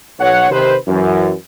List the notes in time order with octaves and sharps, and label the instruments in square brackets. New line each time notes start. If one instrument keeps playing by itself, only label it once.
[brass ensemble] B1 C#5 F#5
C3 D#3 B4 C5
F#2 E3